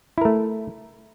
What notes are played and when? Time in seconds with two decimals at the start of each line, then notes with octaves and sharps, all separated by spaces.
0.18 E4
0.21 A#4
0.25 A3